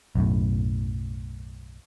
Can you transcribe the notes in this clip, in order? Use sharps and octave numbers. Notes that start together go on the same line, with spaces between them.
B1 F#2 A2